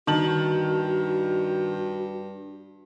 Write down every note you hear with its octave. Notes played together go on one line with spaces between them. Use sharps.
G2 D#3 F#4 A5 F#7